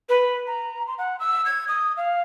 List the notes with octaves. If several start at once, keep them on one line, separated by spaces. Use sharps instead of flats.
B4
A#5
C6
F#5
E6
G#6
D#6
F5